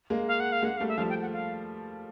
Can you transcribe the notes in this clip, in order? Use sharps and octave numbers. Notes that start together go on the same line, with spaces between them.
G#3 A#3
F5
F#5
F5
G#3 A#3 F#5
F5
G3 A3
E5
F3 G3 F5
G5
F#5
F5